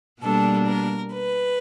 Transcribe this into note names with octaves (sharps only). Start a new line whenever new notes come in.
B2 G3 A#3 D4 A4
A#4
B4